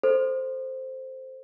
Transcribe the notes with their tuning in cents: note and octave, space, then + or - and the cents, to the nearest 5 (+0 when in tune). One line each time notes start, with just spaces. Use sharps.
A4 +0 C5 +0